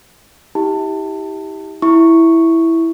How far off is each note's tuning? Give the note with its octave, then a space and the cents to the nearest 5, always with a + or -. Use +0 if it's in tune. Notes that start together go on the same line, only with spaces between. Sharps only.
E4 -35 G4 +0 A5 +25
E4 +0 C#6 +0